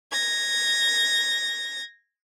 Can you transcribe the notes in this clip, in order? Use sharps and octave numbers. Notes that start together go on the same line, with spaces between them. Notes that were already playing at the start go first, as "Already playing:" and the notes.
G#6 A#6